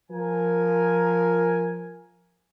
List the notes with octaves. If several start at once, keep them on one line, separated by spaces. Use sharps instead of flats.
F3 A#4 G#5